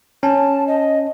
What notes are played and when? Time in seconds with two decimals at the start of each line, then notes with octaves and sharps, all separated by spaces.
0.23 C#4 A5
0.68 D#5